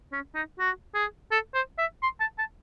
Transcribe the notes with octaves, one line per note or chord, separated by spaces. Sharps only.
C#4
D#4
F#4
G#4
A4
C5
E5
C6
A5
A5